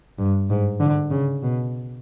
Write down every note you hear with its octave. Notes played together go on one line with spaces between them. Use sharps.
G2
G#2
D3
C#3
B2